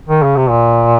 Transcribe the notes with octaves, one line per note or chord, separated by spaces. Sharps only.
D#3
C#3
C3
A#2